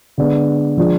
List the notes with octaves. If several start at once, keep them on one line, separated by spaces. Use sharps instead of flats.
D3 G#3 B3 D4
F3 G#3 D4 F4